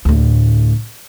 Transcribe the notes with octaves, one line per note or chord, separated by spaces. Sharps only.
D2 A2